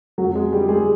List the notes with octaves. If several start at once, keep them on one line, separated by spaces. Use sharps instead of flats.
F2 F#3 F#4
G#3 G#4
D3 F3 G3 G4
G#3 G#4